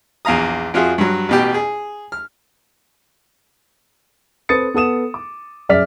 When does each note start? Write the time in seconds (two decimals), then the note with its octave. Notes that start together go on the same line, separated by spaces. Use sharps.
0.25 A#1 E2 F5 A#5 D#6
0.74 F2 F4 F#4 G#4 E5
0.98 G2 F#3
1.29 A1 B2 G4
1.54 G#4
2.12 F6
4.49 C4 A4 B4 D#6 A6 C#7
4.74 B3 A4 D#6 E7
5.14 D6
5.69 F#2 G#4 D5 E5 F6 B6